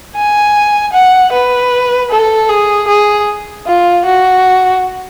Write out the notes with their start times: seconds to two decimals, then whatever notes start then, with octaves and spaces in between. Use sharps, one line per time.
0.16 G#5
0.93 F#5
1.32 B4
2.11 A4
2.49 G#4
2.88 G#4
3.67 F4
4.05 F#4